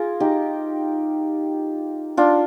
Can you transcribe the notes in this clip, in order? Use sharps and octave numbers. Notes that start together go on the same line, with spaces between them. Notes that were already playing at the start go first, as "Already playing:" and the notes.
Already playing: F4 G#4 A#4
D#4 G4
D4 F4